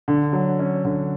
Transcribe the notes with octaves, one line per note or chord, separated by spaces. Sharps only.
D3
F#3
C#4
D3